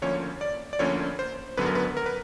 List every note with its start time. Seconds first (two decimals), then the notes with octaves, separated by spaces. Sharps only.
0.02 D2 D3 F3 A#3 C#4 C#5
0.41 D5
0.73 D5
0.79 D2 D3 F3 A#3 C#4 C#5
1.19 C5
1.57 G#1 F#2 D3 F#3 B3 B4
1.66 A#4
1.75 B4
1.97 A#4
2.06 B4